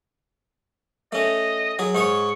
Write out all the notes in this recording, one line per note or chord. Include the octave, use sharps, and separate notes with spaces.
A3 C#4 D#5
F#3 G#4
G#2 G#4 C#5 C#6